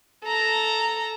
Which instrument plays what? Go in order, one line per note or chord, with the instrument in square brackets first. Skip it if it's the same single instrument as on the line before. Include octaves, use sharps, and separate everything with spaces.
[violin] A4 A#5